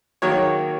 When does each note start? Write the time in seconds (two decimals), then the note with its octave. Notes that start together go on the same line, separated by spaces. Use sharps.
0.22 D#3 F#3 A#3 C#5